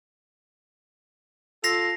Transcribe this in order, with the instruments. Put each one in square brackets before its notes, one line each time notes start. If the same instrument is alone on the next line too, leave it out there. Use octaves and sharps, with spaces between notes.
[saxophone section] F4 A4 [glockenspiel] A#6 C7 F7